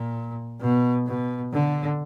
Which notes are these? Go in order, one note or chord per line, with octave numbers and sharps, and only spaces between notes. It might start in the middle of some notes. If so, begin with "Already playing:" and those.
Already playing: A#2
B2
B2
D3